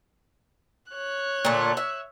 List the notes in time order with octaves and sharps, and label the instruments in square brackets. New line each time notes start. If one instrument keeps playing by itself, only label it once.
[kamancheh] C#5 F#6
[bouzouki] A#2 D3 A3
E5